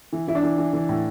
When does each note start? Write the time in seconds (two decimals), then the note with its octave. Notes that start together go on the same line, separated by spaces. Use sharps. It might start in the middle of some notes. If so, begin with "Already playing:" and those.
0.13 E3
0.28 E3 E4
0.35 D4
0.43 E3
0.58 E3
0.73 E3
0.89 A2